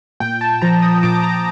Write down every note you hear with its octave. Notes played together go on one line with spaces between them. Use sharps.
A#2 G5
A5
F3 A#5
D#6
A#2 D6
A#5